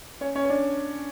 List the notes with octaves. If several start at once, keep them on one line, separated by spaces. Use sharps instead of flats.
C#4 C#5
C#4 C#5
C#5
D4 D5